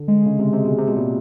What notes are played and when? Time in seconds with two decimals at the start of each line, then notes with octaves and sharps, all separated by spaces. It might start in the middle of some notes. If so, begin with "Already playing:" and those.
Already playing: D3
0.08 G#3
0.26 C#3
0.39 C3
0.53 C3
0.65 B2
0.79 C3
0.88 B2
0.96 A#2